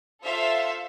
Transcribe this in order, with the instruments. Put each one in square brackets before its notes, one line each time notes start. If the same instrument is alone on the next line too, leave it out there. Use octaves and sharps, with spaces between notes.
[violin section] F4 A4 C5 E5 F5